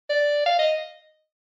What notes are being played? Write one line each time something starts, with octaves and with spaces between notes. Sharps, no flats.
D5
F5
D#5